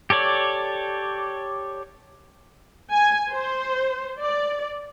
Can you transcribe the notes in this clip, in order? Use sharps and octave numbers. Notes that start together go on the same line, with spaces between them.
G4 A4 C#5 D5
G#5
C5
D5